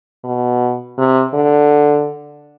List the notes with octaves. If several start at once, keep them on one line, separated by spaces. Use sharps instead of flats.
B2
C3
D3